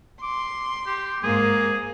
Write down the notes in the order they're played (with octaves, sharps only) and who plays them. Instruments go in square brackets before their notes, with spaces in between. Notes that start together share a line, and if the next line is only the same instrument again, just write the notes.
[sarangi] C6 [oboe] D6
[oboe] G4
[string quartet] G#2 [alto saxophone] A#3 [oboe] G#4